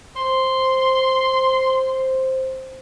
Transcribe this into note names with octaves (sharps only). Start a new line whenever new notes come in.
C5 C6